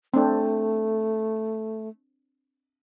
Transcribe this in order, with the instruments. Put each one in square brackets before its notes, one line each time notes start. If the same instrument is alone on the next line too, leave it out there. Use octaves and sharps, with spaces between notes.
[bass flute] A3 [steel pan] C4 D4